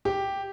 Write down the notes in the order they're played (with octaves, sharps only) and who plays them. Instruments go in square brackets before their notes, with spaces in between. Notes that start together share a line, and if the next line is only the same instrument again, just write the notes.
[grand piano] G4